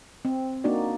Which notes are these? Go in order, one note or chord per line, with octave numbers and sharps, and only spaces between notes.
C4
A#3 D4 D#4 F#4 D5